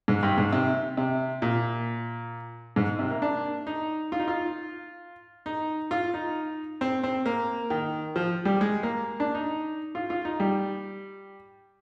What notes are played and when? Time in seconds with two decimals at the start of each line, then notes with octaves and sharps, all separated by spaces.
0.08 G#2
0.23 G2
0.38 G#2
0.53 C3
0.97 C3
1.42 A#2
2.76 G#2
2.99 C3
3.11 A#3
3.22 D4
3.67 D#4
4.12 F4
4.20 D#4
4.28 F4
5.46 D#4
5.91 F4
6.14 D#4
6.81 C4
7.03 C4
7.26 A#3
7.70 D#3
8.16 F3
8.45 G3
8.61 G#3
8.83 A#3
9.20 D4
9.35 D#4
9.95 F4
10.10 F4
10.25 D#4
10.40 G3